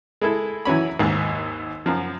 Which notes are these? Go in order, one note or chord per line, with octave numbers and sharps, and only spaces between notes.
G#3 E4 A4
E3 F#3 C#4 B5
G#1 D#2 G#2
F#2 F3